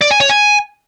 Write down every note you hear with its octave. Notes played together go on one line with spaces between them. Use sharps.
D5
G#5
C#5
G#5